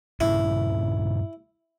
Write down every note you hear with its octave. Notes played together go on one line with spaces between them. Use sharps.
G2 A#2 C#3 E4